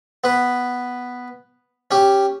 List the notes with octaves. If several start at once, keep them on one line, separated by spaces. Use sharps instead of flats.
B3 B4
C#4 G4